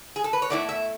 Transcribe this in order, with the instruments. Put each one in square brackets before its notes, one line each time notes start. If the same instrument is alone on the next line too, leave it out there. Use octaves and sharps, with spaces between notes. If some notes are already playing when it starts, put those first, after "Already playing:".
[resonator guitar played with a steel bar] G#4
A4
B4
C#5
B2 A3 E4 D5
E5